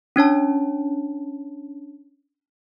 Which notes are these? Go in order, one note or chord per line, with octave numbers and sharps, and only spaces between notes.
C#4 D4 C#5 A5